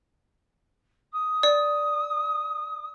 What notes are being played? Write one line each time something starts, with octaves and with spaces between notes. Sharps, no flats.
D#6
D5